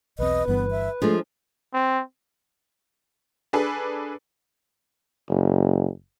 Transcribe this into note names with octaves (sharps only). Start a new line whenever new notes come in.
B1 E2 C4 B4 D#5
G1 G2 E3 B3
E5
F3 G#3 A3 D4 G#4
C4
D4 G#4 A4 B4
F#1